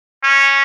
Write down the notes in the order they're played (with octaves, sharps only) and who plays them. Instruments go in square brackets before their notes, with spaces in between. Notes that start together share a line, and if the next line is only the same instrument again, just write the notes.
[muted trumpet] C#4